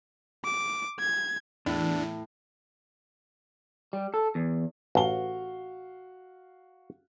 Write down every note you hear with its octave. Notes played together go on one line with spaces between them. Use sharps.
D6
G#6
E2 A2 D4
G3
A4
E2
A1 F#4 F5 G7